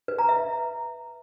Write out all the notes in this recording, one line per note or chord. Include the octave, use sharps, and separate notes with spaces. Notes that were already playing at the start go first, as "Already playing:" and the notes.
B4
A#5
E5